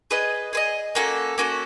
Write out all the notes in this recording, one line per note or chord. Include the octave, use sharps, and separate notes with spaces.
G#4 B4 D#5
G#4 B4 D#5
A#3 C#4 F#4 A4
A#3 C#4 F#4 A4